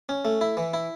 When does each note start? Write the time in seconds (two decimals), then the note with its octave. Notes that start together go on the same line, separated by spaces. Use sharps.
0.09 C#4
0.25 A3
0.41 E4
0.57 E3
0.74 E4